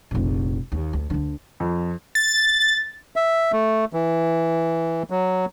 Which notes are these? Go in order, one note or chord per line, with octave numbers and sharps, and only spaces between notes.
F1 A#1
D#2
D2
D2 D3
F2
A6
E5
A3
E3
F#3